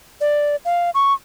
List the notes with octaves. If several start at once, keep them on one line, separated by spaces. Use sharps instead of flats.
D5
F5
C#6